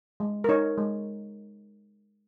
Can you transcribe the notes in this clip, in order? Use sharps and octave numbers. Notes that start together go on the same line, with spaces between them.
G#3
A#4
D#4 C#5
G#3